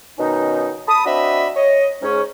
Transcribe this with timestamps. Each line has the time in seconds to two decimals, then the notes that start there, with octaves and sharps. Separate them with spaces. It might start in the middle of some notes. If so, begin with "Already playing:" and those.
0.18 B2 D#3 C#4 D#4
0.88 A5 B5 D#6
1.05 C4 D4 F#4 D#5 E5 B5
1.56 C#5 D#5
2.02 G#2 C#4